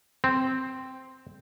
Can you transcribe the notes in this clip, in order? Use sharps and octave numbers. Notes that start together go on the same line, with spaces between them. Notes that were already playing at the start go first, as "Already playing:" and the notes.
C4